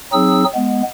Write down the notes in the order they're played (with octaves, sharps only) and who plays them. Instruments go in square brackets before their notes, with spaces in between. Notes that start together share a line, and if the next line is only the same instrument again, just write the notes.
[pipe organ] F#3 C4 D#4 G#4 E6
G#3 B3